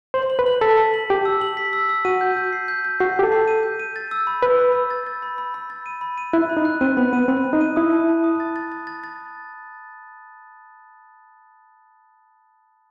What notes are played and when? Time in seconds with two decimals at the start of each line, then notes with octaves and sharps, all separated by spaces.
0.14 C5 F#7
0.30 F#7
0.39 B4
0.46 F#7
0.61 A4 B6
0.78 A5
0.94 F#7
1.09 G4 A5
1.25 E6
1.41 F#7
1.57 B6
1.73 E6
1.89 E6
2.05 F#4 D#7
2.21 G6
2.37 G6
2.53 C7
2.68 G6
2.84 G6
3.00 F#4 C7
3.16 G4 G6
3.23 A4
3.32 C7
3.48 D#7
3.63 G6
3.79 D#7
3.96 A6
4.11 E6
4.27 B5
4.43 B4 E6
4.59 B5
4.75 E6
4.90 A6
5.07 A6
5.22 B5
5.38 B5
5.54 B5
5.70 A6
5.86 D#7
6.01 B5
6.18 D#7
6.33 E4 F#6
6.49 B5
6.57 D#4
6.65 F#6
6.81 C4 D#7
6.97 B3 B5
7.13 B3 D#7
7.28 C4 B5
7.44 F#6
7.53 D#4
7.61 D#7
7.76 E4 D#6
7.92 A5
8.08 A5
8.24 D#6
8.40 A6
8.56 A6
8.72 A6
8.87 A6
9.04 A6